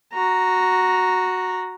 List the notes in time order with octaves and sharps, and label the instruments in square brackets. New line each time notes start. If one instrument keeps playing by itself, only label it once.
[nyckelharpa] F#4 A#5